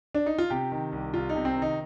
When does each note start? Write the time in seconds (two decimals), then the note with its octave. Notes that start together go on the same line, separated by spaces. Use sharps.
0.15 D4
0.26 D#4
0.38 F4
0.50 C3 G4
0.72 D#3
0.92 C2
1.14 C2 F4
1.29 D#4
1.35 C3
1.45 C4
1.56 D#3
1.62 D#4